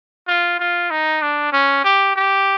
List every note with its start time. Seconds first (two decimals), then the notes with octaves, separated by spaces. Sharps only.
0.27 F4
0.59 F4
0.91 D#4
1.22 D4
1.53 C#4
1.84 G4
2.16 G4